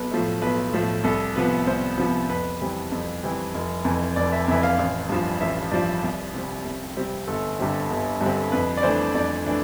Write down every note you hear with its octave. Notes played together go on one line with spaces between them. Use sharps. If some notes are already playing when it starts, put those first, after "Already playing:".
Already playing: B1 B4
A2 F3 A3
B1 B4
A2 F3 A3
C2 A4
C3 F3 B3 B4
C2 C5
C3 F3 B3
F2 B4
E3 G3 C4
F2
E3 G3 C4
F1
F2 E3
F1 D5
E5
F2 E3 E5
F5
A1
G2 F3
A1 E5
G2 F3 D5
C2
C3 G3 C4
C2
C3 G3 C4
G1 A4
G2 D3 G3 C4
G1
G2 D3 G3 C4
F2 B4
D5
E3 A3 D4 C5
F2 D5
E3 A3 D4